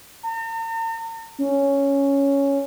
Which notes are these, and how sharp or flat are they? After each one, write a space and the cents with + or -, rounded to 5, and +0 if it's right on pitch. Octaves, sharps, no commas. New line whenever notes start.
A#5 -45
C#4 +5